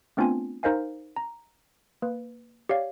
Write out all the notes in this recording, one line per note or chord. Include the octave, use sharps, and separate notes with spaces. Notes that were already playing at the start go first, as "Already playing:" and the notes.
A3 B3 C4 D4 F4 G#5
D#4 A#4 C5 D#5 F5 G#5
A#5
A#3 B4
G4 C#5 D5 F5